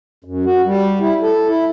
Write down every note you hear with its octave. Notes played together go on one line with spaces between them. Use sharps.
F#2
F#4
G3
E4
A4
E4